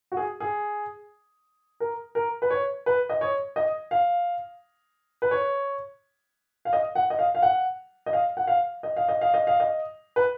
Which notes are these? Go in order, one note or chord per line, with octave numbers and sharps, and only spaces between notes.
F#4
G#4
G#4
A#4
A#4
B4
C#5
B4
D#5
C#5
D#5
F5
B4
C#5
F5
D#5
F#5
D#5
F5
F5
F#5
D#5
F5
F#5
F5
D#5
F5
D#5
F5
D#5
F5
D#5
B4